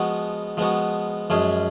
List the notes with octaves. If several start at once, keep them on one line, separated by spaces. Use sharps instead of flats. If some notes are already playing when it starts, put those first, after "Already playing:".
Already playing: F3 G#3 B3 F#4
F3 G#3 B3 F#4
F#2 F3 G#3 C#4 G#4